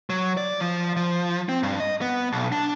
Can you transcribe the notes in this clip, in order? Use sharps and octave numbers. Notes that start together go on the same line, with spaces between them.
F#3
D5
F3
F3
C4
G2
D#5
B3
B1
D4